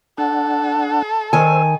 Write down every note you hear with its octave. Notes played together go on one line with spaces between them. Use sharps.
D4 A4 F#5
D#3 C5 G#5 E6